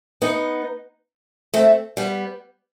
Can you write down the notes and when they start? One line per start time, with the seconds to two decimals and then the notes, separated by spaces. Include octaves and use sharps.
0.22 B3 D#4
1.54 A3 C4
1.97 G3 B3